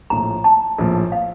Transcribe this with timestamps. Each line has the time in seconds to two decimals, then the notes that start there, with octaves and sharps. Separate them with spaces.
0.10 A#1 A2 F3 A#5
0.44 A5
0.78 A#1 A2 F3
1.12 F5